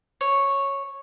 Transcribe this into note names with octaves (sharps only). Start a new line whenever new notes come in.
C#5